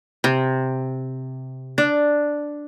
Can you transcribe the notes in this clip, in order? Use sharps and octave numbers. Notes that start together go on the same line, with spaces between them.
C3
D4